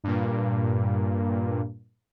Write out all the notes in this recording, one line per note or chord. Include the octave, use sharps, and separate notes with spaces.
G2 A#2